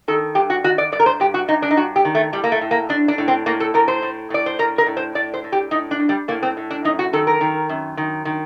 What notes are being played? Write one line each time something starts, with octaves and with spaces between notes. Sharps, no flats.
D#3 A4
G2 G4
F#4
D#3 F#4
D5
G2 D5
A#4
C5
G2 G4
F#4
G2 D#4
D4
D#4
G2 F#4
G4
D#3
A3
A2 G3
A#3
A3
A2
A#3
A2 D4
D4
A2
C4
A2 A#3
A4
A2 A#4
C5
A2
A2 D5
C5
A2 A#4
A#4
A2
C5
A2 D5
C5
A2
G4
A2 D#4
D4
A2
G3
A2 A#3
C4
A2
D4
F#2 D#4
F#4
D#3 A4
A#4
D#3
F#2
D#3
D#3